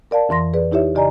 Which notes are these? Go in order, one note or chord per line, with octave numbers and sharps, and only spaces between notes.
A#4 D5 F5 A5
F2 E3 C6 A#6
G#4 B4 D5
D#4 E4 G4 C#5 E5
C#3 G4 D5 D#5 G#5 A#5